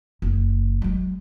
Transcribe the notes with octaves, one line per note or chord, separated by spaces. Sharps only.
F#1
F#3 G#3